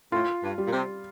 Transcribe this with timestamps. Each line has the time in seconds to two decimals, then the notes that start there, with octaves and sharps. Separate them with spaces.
0.12 A2 F4
0.43 G2
0.58 G3
0.67 A#2
0.72 C3